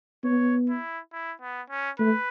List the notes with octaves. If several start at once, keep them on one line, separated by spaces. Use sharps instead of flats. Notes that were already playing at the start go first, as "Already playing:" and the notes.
B3 C#5
E4
E4
B3
C#4
A3 B4